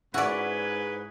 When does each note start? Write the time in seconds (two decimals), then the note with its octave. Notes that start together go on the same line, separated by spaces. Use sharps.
0.14 G#2 E4 F#4 G#4 B4 C#5 D5